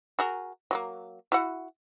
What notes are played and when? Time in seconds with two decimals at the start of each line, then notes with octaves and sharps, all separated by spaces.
0.19 F#4 G#4 A#4
0.71 F#3 A3 A#3
1.32 E4 F#4 F#5